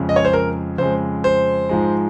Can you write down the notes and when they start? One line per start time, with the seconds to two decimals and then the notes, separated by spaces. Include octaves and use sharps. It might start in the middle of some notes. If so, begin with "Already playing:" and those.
Already playing: F2 C#3 G#3
0.09 D#5
0.16 C#5
0.25 C5
0.33 A#4
0.78 F2 C#3 G#3 C5
1.24 C5
1.69 G#2 F3 G#3